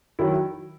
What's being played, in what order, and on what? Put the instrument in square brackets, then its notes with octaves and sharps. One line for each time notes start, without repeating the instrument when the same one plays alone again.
[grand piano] D#3 F#3 E4